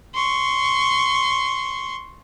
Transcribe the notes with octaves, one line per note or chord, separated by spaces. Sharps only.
C6 C#6